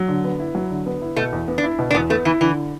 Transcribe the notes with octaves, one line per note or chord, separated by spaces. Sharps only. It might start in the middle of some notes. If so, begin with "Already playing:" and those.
Already playing: F#3
D3
B3
E4
F#3
D3
B3
E4
B2 A3
E2
B3
D4
E4
B2
D4
E2 B3
A3 B3
E3 E4
D3 E3